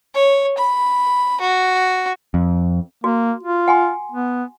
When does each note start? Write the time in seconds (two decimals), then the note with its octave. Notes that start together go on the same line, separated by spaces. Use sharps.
0.15 C#5
0.58 B5
1.41 F#4
2.34 F2
3.04 A#3 F#4
3.43 F4
3.68 F#5 G#5 C6
4.12 B3